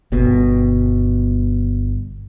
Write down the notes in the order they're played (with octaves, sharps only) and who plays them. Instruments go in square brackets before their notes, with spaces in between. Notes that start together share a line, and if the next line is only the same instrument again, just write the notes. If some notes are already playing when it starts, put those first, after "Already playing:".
[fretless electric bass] G1 B2